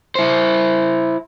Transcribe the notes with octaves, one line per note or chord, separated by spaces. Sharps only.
E4 C5